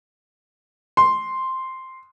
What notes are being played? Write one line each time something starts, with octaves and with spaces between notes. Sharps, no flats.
C6